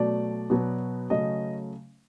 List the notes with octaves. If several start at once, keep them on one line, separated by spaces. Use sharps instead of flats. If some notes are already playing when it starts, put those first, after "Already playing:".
Already playing: B2 F#3 A3 D5
B2 F#3 B3
C#3 F#3 A3 C#4 D#5